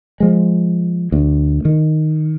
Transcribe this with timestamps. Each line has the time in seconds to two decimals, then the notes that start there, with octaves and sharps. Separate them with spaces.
0.20 F3 G#3
1.12 D2
1.65 D#3